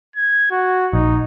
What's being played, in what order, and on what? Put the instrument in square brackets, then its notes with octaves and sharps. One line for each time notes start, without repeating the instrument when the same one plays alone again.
[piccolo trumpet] G#6
F#4
[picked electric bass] A#1 [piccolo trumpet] D#4